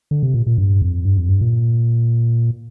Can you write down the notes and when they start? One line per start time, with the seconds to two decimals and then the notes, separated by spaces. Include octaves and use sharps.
0.11 D3
0.23 C3
0.34 A#2
0.47 A#2
0.58 G2
0.82 F2
1.05 G2
1.17 F2
1.29 G2
1.41 A#2